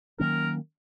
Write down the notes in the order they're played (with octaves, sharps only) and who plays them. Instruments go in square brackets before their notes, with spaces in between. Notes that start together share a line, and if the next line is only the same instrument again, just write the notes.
[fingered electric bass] D#3 F#3 A#3 C#4 [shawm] A#4